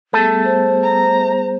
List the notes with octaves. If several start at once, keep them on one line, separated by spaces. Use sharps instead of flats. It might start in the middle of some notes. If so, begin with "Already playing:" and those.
G3 A3 B3 G#4 A4
C5
A#5